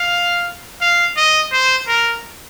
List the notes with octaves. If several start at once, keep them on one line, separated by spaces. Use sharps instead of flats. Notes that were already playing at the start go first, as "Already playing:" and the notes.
Already playing: F5
F5
D#5
C5
A#4